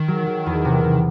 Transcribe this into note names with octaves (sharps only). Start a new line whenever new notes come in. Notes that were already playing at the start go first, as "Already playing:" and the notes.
Already playing: D#3
F#3
F#3
E2
C3
C3